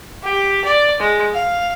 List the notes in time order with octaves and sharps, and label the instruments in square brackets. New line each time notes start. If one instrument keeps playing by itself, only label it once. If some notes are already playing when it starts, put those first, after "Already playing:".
[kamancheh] G4
D5
G#3
F5